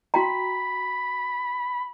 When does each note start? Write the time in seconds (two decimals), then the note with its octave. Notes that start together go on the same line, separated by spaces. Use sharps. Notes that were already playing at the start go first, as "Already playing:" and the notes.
0.14 F#4 G5 A#5 B5